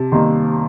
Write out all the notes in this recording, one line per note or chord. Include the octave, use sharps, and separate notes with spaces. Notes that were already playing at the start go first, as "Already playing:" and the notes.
Already playing: C3 A5
D#3 G3 A#3 C6